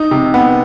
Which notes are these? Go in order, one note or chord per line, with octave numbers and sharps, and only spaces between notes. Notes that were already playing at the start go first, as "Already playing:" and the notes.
Already playing: D#4
C3
B3